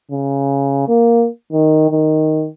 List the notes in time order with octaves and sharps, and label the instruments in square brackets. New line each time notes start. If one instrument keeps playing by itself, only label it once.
[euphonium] C#3
A#3
D#3
D#3